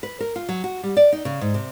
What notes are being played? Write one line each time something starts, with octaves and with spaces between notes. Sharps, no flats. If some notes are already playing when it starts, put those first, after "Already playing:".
B4
A#4
F4
F#3
F#4
G3
D5
D#4
C#3
G#2
C3